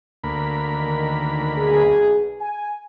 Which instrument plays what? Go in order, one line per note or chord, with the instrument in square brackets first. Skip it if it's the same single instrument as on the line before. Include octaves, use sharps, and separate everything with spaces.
[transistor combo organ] D2 A#3 B5
[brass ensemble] D#3
B1 G#4
G#5